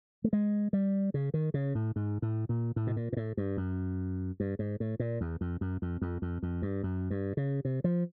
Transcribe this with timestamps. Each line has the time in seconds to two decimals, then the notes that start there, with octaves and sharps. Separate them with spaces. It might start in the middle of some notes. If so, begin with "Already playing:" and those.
0.24 A3
0.33 G#3
0.73 G3
1.14 C#3
1.34 D#3
1.54 C#3
1.75 A2
1.96 G#2
2.22 A2
2.49 A#2
2.76 A2
2.87 B2
2.97 A#2
3.13 A#2
3.17 A2
3.37 G2
3.57 F#2
4.40 G2
4.59 G#2
4.80 A2
5.00 A#2
5.21 E2
5.41 F2
5.61 F#2
5.82 F2
6.02 F2
6.22 F2
6.43 F2
6.62 G2
6.83 F#2
7.10 G2
7.37 C#3
7.65 C3
7.84 F3